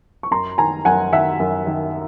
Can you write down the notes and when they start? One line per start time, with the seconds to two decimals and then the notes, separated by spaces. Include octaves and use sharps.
0.23 C#6
0.31 F#2 A#5 C6
0.58 D#3 G#5 A#5
0.85 F#2 F#5 G#5
1.12 D#3 E5 F#5
1.40 F#2
1.67 D#3